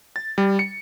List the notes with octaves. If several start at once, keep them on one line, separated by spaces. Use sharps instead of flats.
A6
G3
C#7